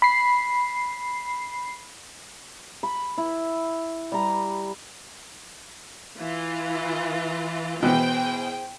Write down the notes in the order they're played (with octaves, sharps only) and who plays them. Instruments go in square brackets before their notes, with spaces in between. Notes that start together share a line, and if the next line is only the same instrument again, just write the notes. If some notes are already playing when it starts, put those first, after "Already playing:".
[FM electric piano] B5 C7
[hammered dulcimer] B5
E4
G3 A#5
[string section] E3 F4
[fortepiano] B2 E3 B3 [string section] G#4 C5 G5